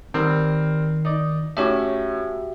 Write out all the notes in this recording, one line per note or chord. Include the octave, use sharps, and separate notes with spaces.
D#3 G3 C4 A#4
D#4 D5
A2 C#4 F#4 G4 E5 D6